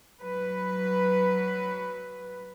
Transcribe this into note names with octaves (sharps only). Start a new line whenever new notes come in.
F#3 B4